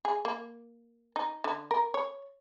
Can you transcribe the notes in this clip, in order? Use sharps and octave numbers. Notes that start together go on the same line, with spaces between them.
G#4
A#3
D#4
D3
A#4
C#5